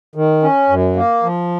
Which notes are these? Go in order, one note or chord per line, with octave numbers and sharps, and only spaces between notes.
D#3
C#4
F#2
A#3
F3